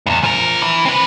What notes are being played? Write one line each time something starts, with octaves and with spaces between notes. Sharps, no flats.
E2 G2
F3 A#4
E3
C4 B4